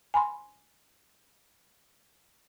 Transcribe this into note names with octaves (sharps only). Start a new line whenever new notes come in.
G#5 B5 C6